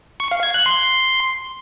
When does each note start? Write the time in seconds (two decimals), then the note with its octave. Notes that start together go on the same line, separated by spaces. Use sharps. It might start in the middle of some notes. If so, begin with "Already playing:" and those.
0.20 C#6
0.31 F5
0.43 G#6
0.54 F#6
0.66 C6